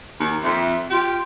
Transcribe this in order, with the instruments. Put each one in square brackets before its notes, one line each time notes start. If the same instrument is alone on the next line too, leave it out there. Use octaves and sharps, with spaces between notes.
[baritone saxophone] D#2
[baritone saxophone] F2 [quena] E5
[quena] F4 [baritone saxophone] G4